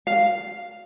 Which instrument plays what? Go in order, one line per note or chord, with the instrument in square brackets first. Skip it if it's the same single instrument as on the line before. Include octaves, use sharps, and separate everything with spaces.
[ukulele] F5